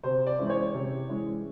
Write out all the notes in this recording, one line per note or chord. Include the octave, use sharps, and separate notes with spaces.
C3 C5
D5
E3 G#3 C#4 E4
C5
C#5
C3
E3 G#3 C#4 E4